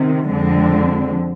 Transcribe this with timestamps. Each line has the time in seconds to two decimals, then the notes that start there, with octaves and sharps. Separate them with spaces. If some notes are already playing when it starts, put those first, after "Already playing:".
Already playing: C3 D#3
0.28 F2 D3 G#3 C4